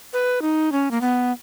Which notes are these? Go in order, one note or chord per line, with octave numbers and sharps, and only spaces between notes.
B4
D#4
C#4
A#3
B3